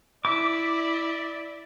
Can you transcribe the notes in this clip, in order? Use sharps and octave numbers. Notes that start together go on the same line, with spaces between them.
E4 D5 E5 D6